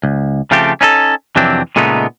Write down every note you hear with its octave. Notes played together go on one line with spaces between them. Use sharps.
C#2
C#3 F3 A3 C4 G4
C#4 D#4 F#4 A4
F2 C3 E3 F#3 C4 D4
A#2 C#3 G#3 A3 B3 D#4